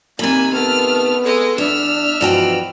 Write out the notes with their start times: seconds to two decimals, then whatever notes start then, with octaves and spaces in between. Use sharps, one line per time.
0.19 C3 D#3 A#3 G#5 B5
0.54 A3 B3 A#4 F6
1.24 G#3 A4 D#5
1.58 E2 D4 E5 F6
2.21 G2 B2 E3 F3 F#4 G5